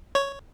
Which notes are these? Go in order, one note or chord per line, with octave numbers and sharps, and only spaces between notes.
C#5